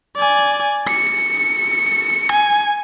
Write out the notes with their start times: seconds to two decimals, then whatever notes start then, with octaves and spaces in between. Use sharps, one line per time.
0.17 D5 G#5
0.88 C#7
2.32 G#5